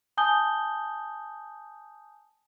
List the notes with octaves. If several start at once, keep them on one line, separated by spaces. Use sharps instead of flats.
G#5 A5 D#6 G6 G7